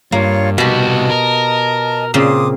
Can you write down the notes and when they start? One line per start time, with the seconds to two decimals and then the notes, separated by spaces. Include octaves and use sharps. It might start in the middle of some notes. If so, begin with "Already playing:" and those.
0.12 G2 A#3 F4 C#5
0.58 C2 B2 F#4 G4 D#5 A5
1.10 A#4
2.14 A#2 C#3 C4 C6 D6 D#6